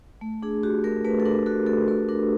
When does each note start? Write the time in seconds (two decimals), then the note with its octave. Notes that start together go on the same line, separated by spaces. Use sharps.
0.21 A3
0.43 D4 G#4
0.63 F#4 G4
0.84 A3 A#4
1.04 A3 B4
1.20 A4
1.25 D4 A#4
1.46 F#4 A4
1.67 A3 A4
1.88 A3 A#4
2.09 D4 A#4